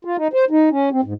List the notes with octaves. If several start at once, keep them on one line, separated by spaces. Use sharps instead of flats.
F4
D#4
C5
D#4
C#4
C4
G#2